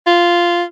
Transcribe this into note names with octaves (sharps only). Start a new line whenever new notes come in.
F4